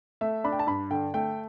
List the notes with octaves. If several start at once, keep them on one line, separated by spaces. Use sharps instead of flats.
A3 E5
D4 B5
G5
A5
G2 B5
D3 G5
A3 G5